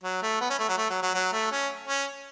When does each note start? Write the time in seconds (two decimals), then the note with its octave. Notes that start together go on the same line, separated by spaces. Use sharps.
0.04 F#3
0.22 A3
0.41 B3
0.50 C#4
0.59 A3
0.69 F#3
0.77 A3
0.90 F#3
1.02 F#3
1.14 F#3
1.32 A3
1.52 C#4
1.87 C#4